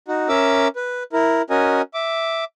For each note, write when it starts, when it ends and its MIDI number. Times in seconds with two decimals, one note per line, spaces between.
0.08 0.28 63
0.08 0.28 66
0.29 0.68 61
0.29 0.68 70
0.29 0.68 76
0.29 0.68 86
0.29 0.68 88
0.76 1.03 71
1.13 1.42 64
1.13 1.42 70
1.50 1.82 61
1.50 1.82 66
1.50 1.82 70
1.50 1.82 75
1.50 1.82 80
1.94 2.44 76
1.94 2.44 86